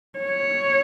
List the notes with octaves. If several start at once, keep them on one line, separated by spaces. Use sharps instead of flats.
C#5